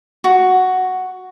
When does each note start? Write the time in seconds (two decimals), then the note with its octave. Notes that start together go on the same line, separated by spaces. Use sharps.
0.24 F#4